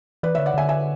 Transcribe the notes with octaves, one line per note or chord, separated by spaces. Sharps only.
E3 B4 D5
D3 C#5 E5
D5 F#5
D3 E5 G#5
E5 G#5